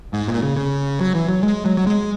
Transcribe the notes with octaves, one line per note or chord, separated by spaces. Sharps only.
G#2
A#2
C#3
C#3
F#3
E3
F#3
G#3
F#3
F#3
G#3